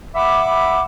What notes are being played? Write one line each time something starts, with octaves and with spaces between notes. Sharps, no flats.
E5 F#5 B5 D6